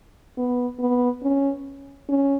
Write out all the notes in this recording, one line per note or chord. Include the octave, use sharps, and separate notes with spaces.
B3
B3
C#4
C#4